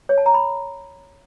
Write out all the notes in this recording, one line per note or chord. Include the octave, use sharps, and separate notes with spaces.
C#5
A5
A#5
B5